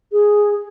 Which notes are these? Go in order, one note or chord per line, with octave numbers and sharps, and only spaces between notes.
G#4